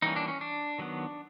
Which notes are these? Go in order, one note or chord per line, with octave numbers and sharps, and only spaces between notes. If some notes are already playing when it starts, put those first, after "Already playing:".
E3 G3 A#3 C#4 D#4
D4
C#4
D4
D#3 F#3 B3